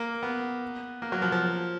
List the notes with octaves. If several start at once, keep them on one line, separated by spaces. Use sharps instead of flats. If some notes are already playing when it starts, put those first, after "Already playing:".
Already playing: A#3
B3
A#3
F#3
F3
F3